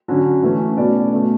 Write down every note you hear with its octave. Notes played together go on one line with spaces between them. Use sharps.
D3 F#3 C#4
E3 A3 C#4
B2 A3 C#4 B4 D5
B2 A3 C#4